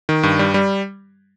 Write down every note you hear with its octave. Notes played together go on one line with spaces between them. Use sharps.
D#3
G2
G3
G3